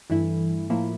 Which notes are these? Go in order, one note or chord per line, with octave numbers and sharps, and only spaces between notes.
G2 E3 A3 E4
A2 F3 A#3 E4